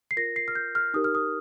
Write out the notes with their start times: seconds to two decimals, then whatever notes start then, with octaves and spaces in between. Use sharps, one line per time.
0.11 C7
0.16 F4 A#4 A#6
0.36 C7
0.48 F6
0.55 G6
0.75 F6
0.94 D#4 G4 A#4 D#6
1.04 F6
1.15 D#6